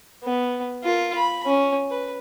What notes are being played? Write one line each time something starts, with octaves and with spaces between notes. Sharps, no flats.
B3
F4 A#4
B5
C#4
B4